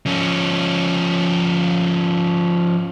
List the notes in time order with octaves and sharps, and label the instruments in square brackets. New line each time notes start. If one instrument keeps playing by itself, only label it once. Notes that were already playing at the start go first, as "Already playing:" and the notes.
[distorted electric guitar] F3 C#4